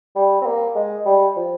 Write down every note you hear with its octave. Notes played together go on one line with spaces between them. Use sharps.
G3
C4
A#3
G#3
G3
F3